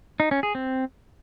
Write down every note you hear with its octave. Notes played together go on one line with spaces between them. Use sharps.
D#4
C#4
G#4
C4